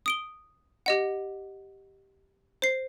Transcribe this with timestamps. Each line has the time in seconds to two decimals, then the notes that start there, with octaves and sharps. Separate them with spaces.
0.06 D#6 D7 G7
0.86 G4 D#5 F#5
2.62 C5 C7